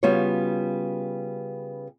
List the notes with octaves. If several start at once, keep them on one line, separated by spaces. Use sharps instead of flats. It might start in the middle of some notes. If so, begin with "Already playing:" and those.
C#3 G3 B3 F4 F#4 C#5